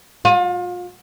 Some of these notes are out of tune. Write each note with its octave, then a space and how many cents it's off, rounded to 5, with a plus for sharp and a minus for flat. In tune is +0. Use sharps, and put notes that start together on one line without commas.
F4 +35